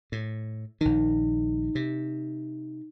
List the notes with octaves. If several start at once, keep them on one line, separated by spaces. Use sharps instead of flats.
A2
A#1 D#3 D#4
C3